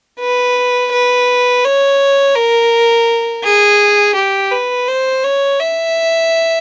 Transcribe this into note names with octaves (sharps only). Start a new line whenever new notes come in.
B4
B4
C#5
A#4
G#4
G4
B4
C5
C#5
E5